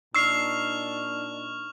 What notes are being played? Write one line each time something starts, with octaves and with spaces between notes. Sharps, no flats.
A#2 D4 D#4 C#6 E6 F6 C7 F7